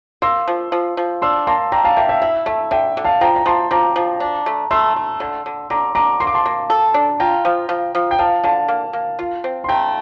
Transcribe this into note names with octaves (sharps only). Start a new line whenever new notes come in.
A#3 C6 E6
F3
F3
F3
D4 C6 E6
A#3 A5 C6
D4 G5 A#5
F5 A5
A#3 E5 G5
E5 G5
E4 E5
A3 E5
D3 E5 G5
D3
F5 A5
F3 G5 A#5
A#5
F3 A5 C6
F3 A#5 D6
F3
D4
A3
A3 C6 E6
A3
D3
D3
D3 A#5 D6
D3 A#5 D6
A#3 C6
D6
A5 C6
A#3
A4
D4
F4 G5 A#5
F3
F3
F3
G5
F3 F5 A5
D3 F5 A5
A#3
A#3
F4
C4
C6
A3 G5 A#5